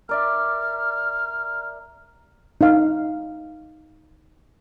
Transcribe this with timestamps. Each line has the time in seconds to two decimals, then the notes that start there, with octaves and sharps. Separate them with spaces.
0.09 A#4 D5 E5 F6
2.61 D#4 F5